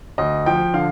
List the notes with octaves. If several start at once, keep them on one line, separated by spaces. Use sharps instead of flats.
D2 D#5
F3 G5
D3 F5